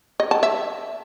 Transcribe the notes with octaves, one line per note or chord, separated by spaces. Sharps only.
D#5
A5
E5